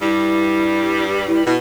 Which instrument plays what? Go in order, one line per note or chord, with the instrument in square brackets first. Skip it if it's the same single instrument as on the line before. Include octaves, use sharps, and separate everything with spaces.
[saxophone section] G2 G3 [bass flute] E4
[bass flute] E4
[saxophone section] B2 [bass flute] E4